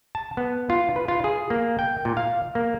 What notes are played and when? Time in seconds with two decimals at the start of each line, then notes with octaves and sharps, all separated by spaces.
0.15 A5
0.37 B3
0.70 F4
0.96 B4
1.08 F4
1.24 G#4
1.50 A#3
1.79 G5
2.05 A#2
2.17 F5
2.55 A#3